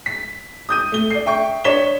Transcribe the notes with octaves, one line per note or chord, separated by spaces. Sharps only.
B6
D#6 G6 D#7
A3 G7
D5 C7
E5 G5 C#6 G6
D4 C#5 B6 E7 G7